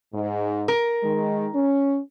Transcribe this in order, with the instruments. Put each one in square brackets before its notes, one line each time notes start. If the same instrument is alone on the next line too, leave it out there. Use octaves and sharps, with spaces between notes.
[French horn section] G#2
[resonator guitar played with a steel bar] A#4
[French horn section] D#3 G#3
C#4